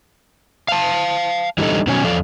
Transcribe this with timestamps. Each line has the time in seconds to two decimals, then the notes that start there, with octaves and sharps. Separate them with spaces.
0.68 F5 A5
1.58 E3 G3 D4 D#4 A4
1.87 B2 D#3 F#3 C#4 C#5 G#5
2.04 E2 F3 A4 D5 F5